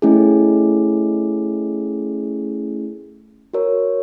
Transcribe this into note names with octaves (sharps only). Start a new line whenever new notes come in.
A3 C#4 E4 G#4
F#4 A#4 C#5